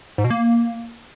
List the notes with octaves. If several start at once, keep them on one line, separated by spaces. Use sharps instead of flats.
G#2
B2
A#3